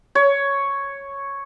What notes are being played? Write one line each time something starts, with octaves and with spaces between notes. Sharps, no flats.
C#5